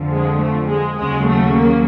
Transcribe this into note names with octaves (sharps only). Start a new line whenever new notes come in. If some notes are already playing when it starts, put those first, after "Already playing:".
Already playing: F2 D3 F3
G#3
A3
G#3
D#2 C#3 F#3 G#3
A3
A#3